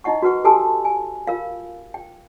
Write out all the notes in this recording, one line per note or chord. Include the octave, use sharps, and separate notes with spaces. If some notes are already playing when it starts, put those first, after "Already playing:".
D#4 E4 D#5 F#5 C#6
F#4 A#4 B4 F#5 C#6
G4 A4 G#5 A5 C6 E6
G#5
F4 A#4 F5
G5